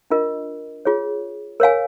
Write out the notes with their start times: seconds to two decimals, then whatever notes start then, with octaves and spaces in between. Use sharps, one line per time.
0.10 D4 F4 A#4 D#5
0.85 F4 G#4 C#5
1.60 A#4 C#5 F5 G#5